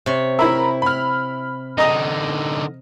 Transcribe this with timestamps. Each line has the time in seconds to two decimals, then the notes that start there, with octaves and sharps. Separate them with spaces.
0.06 C3 C#5
0.39 E4 A#4 E5 B5
0.82 B5 F6
1.78 D3 D#4 D#5 A#5 D#6